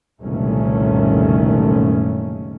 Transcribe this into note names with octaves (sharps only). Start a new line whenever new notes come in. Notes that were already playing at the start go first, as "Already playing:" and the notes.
F#1 C2 A#2 D#3 A3 C#4